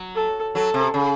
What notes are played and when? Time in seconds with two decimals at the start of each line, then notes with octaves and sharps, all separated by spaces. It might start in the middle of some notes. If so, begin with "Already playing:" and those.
Already playing: F#3
0.15 A4
0.55 F#3 A4
0.74 C3
0.94 C#3